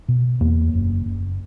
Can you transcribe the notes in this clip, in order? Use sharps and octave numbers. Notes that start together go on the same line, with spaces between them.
B2
E2 A#3
F#1
F#1